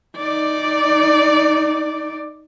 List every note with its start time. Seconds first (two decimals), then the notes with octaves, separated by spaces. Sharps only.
0.18 D#4 D5